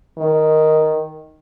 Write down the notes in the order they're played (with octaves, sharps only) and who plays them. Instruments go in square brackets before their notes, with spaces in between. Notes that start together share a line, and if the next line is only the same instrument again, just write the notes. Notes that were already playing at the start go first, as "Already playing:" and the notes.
[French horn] D#3